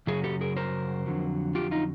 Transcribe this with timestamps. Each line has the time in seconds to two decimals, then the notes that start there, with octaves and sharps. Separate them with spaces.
0.07 F#2 C#3 F#3 G#4
0.24 G4 A4
0.41 G#4 A#4
0.56 A#4 C5
1.06 F2 D3 F#3
1.55 F4 G4
1.71 D#4 F4